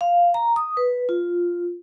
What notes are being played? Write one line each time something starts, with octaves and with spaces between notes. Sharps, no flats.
F5
A#5
D#6
B4
F4